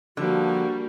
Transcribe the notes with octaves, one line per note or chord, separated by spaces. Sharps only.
D3 F3 G3 A#3 F#4